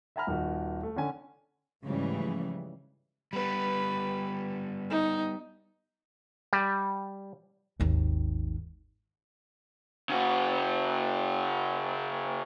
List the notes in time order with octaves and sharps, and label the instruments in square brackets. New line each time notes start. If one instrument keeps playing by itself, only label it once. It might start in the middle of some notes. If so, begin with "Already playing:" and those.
[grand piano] E5 F#5 G#5 A#5 B5 F6
D#1 D#3 F#4
A3
D3 C#4 G#5
[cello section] G#2 C#3 E3 F3 G3 A3
[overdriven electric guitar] G3 B3 [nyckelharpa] B4
[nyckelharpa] D#4
[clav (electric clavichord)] G3
[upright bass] G#1 D#2
[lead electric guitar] C#3 F#4